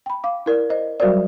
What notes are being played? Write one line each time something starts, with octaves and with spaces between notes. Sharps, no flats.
G5 B5
F5 D6
E4 A#4 D5
C5 D#5
F#3 G3 F#4 A#4 C5 D5